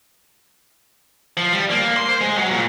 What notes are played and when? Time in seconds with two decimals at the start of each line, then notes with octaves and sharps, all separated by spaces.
1.37 F3
1.53 G3
1.70 A#3
1.97 C6
2.09 C5
2.21 G#3
2.38 F#3
2.51 A#2